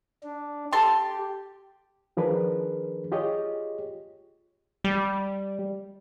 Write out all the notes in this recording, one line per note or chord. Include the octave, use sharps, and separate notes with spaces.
D4
G4 A4 A5 C6
D#3 F3 D4 G#4 A#4 B4
F4 G4 G#4 C#5 D#5
G3